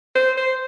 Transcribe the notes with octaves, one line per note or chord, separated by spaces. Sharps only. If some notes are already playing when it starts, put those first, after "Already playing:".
C5
C5